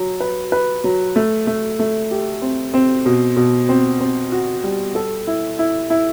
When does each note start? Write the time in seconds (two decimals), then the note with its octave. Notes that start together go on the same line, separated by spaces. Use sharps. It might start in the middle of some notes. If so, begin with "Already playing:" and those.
Already playing: F#3
0.20 B4
0.52 B4
0.84 F#3
1.16 A3
1.47 A3
1.79 A3
2.11 G4
2.42 C4
2.74 C4
3.06 B2
3.37 B2
3.69 C4
4.01 C4
4.32 F#4
4.64 G3
4.95 A4
5.27 E4
5.59 E4
5.90 E4